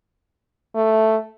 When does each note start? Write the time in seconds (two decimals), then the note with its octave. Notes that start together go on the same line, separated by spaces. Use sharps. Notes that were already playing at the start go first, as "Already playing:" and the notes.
0.76 A3